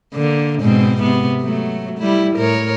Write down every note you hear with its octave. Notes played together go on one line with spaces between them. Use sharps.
D3 A#3
G#2 B2 C4
C3 B3
F#3 A3
G3 E4
A2 A#4 C#5